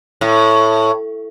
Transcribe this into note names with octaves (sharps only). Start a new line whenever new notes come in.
A2